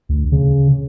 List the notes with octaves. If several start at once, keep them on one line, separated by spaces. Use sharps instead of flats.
D2
C#3